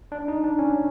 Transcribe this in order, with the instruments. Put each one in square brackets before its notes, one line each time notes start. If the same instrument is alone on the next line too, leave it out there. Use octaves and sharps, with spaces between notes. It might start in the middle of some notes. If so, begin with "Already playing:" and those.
[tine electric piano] D4
D#4
D4
C#4